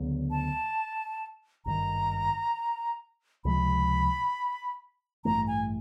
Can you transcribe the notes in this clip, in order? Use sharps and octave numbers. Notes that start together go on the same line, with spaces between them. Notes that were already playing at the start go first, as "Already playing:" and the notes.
Already playing: D2 C#3 F#3 B3
A5
G#1 G2 D#3 A#5
C#2 C3 F3 G#3 B5
A1 G2 E3 A3 A#5
G#5